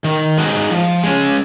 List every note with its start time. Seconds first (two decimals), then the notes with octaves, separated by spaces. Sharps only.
0.04 D#3
0.38 G#3 D#4 F#4
0.70 F3
1.03 G#3 C#4